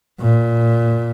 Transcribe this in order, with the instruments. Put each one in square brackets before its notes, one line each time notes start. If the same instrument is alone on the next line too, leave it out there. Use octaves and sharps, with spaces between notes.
[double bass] A#2